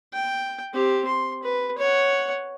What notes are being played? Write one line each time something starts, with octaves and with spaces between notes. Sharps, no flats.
G5
C4 G4
C6
B4
C#5 F#5